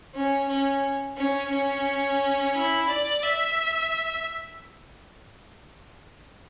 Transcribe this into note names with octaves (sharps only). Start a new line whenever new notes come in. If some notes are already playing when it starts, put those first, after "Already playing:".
C#4
C#4
C#4
C#4
E4
D5
E5